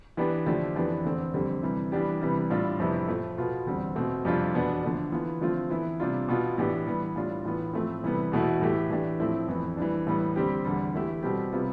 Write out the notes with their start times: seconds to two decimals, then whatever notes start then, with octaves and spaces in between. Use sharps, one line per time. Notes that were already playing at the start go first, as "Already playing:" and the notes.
0.17 E3 B3 D4 G4
0.46 D3 F3 A3 D4 G4
0.75 F2 E3 B3 D4 G4
1.05 E2 D3 A3 C4
1.34 F2 D3 G3 C4 G4
1.63 C3 E3 G3
1.92 E3 G3 B3 D4 G4
2.21 C3 E3 G3 B3
2.50 A2 G3 D4 F4
2.79 F2 C3 G3 B3 E4
3.08 A2 F3 A3
3.38 B2 B3 F4
3.67 E2 D3 G3 C4
3.96 B2 A3 C4
4.25 F2 C3 G3 D4 F4
4.54 E2 B2 B3 D4
4.83 D3 F3 A3 D4
5.12 E3 B3 F4
5.41 D3 F3 A3 C4 F4
5.70 E3 B3 E4
6.00 C3 G3 D4 F4
6.28 B2 B3 F4
6.58 A2 E3 B3 D4 G4
6.87 E3 G3 B3
7.16 A2 G3 D4 F4
7.45 A2 E3 B3 F4
7.73 A2 F3 A3 C4
8.04 C3 E3 G3 B3
8.32 E2 B2 A3 E4
8.61 A2 E3 A3 E4 G4
8.90 E3 A3 D4 G4
9.20 A2 F3 A3 C4 E4
9.48 F2 E3 B3
9.77 E3 G3 D4
10.07 A2 E3 G3 B3
10.36 D3 G3 C4 G4
10.65 E2 D3 G3
10.94 E3 A3 E4 G4
11.23 B2 G3 C4 G4
11.52 C3 G3 B3 F4